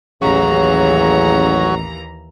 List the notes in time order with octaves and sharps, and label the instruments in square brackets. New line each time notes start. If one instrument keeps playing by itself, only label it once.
[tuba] A1 [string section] D#2 E3 A#5 [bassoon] C#3 [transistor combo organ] F#3 C#4